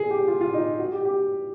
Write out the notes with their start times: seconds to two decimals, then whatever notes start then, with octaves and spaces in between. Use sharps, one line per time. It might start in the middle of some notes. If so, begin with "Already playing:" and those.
Already playing: G#4
0.11 G4
0.28 F4
0.41 F4
0.54 D#4
0.79 F#4
0.92 G4
1.05 G4